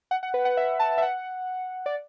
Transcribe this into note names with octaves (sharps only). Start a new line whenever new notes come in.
F#5
F#5
B4
F#5
E5
A5
E5
F#5
D5